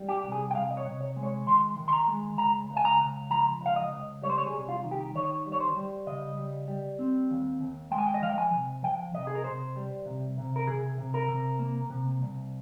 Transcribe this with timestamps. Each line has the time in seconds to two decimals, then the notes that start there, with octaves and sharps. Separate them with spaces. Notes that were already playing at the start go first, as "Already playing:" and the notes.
Already playing: G3
0.09 G4
0.23 C2
0.32 G#4
0.51 G5
0.55 C2 F5
0.71 D#5
0.77 C#5
0.85 C3
1.01 C#5
1.16 G#3
1.23 C#5
1.46 D#3 C6
1.77 D#3
1.88 C6
1.93 A#5
2.08 G#3
2.38 C#2 A#5
2.70 C#2
2.77 G#5
2.85 A#5
3.00 C#2
3.30 F3 A#5
3.61 C#2 F5
3.76 D#5
3.92 C#2
4.22 G3 C#5
4.30 C5
4.38 C#5
4.46 G#4
4.54 C2
4.69 F4
4.84 D#3
4.91 G4
5.15 D#3 C#5
5.46 G3
5.52 C#5
5.60 C5
5.77 G3
6.07 C#3 D#5
6.37 G3
6.68 G3
6.99 C4
7.31 D#2
7.61 D#2
7.91 G#3 G5
7.98 G#5
8.07 G5
8.14 D#5
8.22 F3 F5
8.29 G5
8.38 G#5
8.52 C3
8.83 F3 G5
9.14 C3 D#5
9.27 G#4
9.35 A#4
9.44 C3 C5
9.76 G3
10.06 C3
10.38 C3
10.56 A#4
10.67 C3 G#4
10.98 C3
11.14 A#4
11.29 C3
11.59 A#3
11.90 C3
12.22 C2